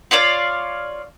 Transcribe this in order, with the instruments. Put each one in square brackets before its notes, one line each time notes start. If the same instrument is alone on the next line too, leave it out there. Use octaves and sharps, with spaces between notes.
[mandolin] F4 C#5 D5 F5